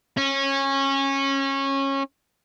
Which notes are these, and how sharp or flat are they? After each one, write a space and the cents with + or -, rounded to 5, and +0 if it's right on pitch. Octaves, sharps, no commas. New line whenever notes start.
C#4 -20